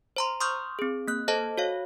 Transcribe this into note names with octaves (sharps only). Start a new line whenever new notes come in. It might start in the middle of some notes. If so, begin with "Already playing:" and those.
C5 A#5 C6
C6 C#6 D#6 F6 G6
C4 G#4
A#3 F#6
A4 C5 D#5 A5
F#4 C#5 F5